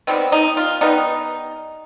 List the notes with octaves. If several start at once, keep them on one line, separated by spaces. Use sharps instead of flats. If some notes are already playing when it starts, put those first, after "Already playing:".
D#3 G3 B3 C4
D#4
F4
D#3 G3 B3 D#4